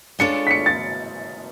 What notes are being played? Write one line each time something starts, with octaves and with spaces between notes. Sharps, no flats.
G#3 D4 F4 A4 C#5 C#7
B6
C#7
A6